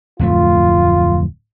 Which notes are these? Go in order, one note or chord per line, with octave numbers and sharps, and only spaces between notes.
D1 F2 A3 F4